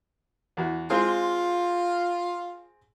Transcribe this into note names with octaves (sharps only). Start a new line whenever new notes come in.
E2 F#4
G#3 C4 F4 G#4